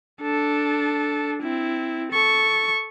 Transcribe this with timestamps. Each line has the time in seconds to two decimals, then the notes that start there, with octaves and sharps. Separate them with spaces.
0.21 D4 A4
1.42 C4 E4
2.12 A4 C#6